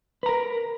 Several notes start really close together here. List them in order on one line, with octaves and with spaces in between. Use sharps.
B4 A#5 A#4